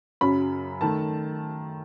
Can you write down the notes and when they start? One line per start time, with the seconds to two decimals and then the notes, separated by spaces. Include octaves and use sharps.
0.21 F#2 C#3 F#3 B5
0.81 D#3 A3 A5